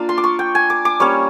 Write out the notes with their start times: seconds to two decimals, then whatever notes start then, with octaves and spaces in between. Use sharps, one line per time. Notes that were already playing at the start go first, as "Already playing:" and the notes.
Already playing: A#3 D4 F4
0.09 C6
0.18 D6
0.24 C#6
0.39 G5
0.55 G#5
0.70 D6
0.85 D6
1.00 G3 A#3 C#4 C#6